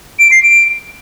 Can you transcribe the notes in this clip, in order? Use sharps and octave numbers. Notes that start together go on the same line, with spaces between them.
D7
C7
D7